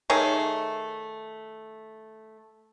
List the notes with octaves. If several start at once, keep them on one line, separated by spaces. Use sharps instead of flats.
D#3 A3 G#4 C#5